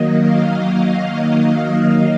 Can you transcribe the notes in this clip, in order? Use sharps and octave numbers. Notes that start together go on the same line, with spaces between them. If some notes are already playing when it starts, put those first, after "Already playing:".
Already playing: D#3 F#3 A#3 D#5
F5